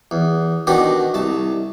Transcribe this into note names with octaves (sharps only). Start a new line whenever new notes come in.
E2
B2 D#3 D4 F#4 G4
C2 A5